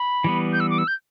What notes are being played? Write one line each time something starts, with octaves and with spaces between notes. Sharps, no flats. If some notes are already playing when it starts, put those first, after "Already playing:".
Already playing: B5
E3 G3 B3
G6
E6
D6
E6
G6